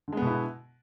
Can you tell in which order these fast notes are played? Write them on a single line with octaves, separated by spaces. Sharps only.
D3 G#3 B3 B2 E4